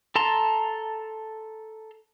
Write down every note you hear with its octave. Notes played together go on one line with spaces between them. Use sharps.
A4 A5 A#5 C6